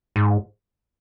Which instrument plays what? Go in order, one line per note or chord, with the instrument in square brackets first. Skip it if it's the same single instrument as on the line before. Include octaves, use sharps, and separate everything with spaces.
[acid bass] G#2